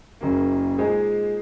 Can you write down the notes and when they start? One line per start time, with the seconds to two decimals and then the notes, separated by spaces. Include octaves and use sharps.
0.21 F#1 F#2 C#3 F#3 A#3
0.78 A#2 G#3 D#4 G#4 C5